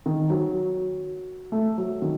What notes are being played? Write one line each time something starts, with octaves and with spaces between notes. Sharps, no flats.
D#3
F#3
A3
F#3
D#3